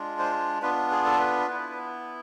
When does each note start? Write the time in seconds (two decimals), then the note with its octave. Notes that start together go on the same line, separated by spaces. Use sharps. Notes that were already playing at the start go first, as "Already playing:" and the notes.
Already playing: G#3 D4 F4
0.19 C5
0.62 B3 D4 F4 B4
0.91 G#4
1.05 A4
1.19 B4
1.47 B3 E4